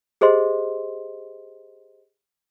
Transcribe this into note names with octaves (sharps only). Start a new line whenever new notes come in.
G4 G#4 C5 D#5 C6